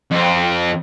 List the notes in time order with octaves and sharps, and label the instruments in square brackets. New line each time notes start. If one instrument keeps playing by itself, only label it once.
[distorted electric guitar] F2 C4